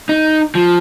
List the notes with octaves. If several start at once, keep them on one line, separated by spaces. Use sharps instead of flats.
D#4
F3